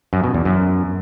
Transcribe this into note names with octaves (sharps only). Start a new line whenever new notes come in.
F#2
B2
E2
F#2